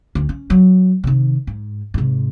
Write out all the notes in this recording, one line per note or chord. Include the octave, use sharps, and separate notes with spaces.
D2 C#4
C#4
F#3
C3 D#3
G#2
G#2 C3